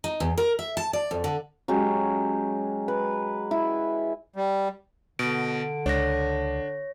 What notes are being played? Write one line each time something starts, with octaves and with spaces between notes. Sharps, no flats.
D#4
E2
A#4
E5
A5
D5
F2
D3
F#3 G#3 C#4 G4
B4
E4
G3
B2 D3 D7
C#2 D4 C#5 A#6